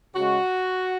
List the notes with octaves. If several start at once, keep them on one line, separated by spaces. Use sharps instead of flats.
C#3 G#3 F#4